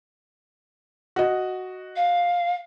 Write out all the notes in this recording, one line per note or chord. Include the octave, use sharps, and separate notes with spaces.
F#4 D#5
F5